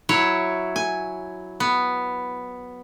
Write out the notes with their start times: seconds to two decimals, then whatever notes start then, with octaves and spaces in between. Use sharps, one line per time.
0.09 F#3 E4 C#5
0.76 G#5
1.60 B3